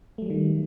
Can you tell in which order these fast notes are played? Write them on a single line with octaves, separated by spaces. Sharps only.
A3 F#3 G3 D#3